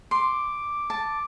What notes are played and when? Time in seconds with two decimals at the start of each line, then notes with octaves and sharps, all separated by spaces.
0.11 C6 D6
0.90 A5